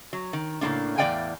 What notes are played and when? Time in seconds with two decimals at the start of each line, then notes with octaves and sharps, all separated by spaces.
0.13 F#3
0.33 D#3
0.61 A2 C#3 G#3 A#3 D4
0.98 E2 A2 D5 F5 G5 G#5